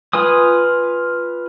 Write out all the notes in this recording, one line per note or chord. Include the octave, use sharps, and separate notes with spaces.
F4 B4 G#5 D#6